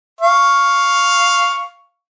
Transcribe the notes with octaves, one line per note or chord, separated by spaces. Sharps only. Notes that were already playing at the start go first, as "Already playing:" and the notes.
F5 C#6